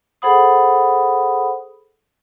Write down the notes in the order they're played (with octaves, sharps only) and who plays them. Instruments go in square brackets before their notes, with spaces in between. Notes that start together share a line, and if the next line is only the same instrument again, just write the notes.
[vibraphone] G#4 A4 C5 F#5 B5 D#6